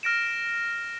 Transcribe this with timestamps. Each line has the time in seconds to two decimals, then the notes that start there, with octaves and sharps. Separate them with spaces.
0.03 F6 A#6 D7 E7